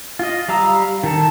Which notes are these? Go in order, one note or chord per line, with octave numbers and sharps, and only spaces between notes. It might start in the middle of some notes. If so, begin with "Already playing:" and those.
F4 D#5
G3 F5 A#5 E6
D#3 A4